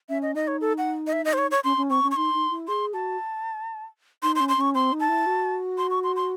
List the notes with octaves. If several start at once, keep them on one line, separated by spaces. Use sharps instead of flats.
C#4 E5
D#5
D#4 D#5
C#5
A4
F#5
D#5
E5
D#5
C5
C#5
C#5
C#4 C6
C#4
C4 C#6
C#4
C#6
D#4 C6
D#4
E4
G#4 C6
F#4 A5
D#4 C6
C6
C#4
C6
C#4 C#6
C4 C6
D#4
A5
E4
F#4
C6
C#6
C6
C6